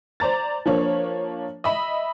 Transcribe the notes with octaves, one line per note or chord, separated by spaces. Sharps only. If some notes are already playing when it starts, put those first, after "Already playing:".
C5 D5 A#5 A6
F3 A#3 D4 C#5
D#5 E5 B5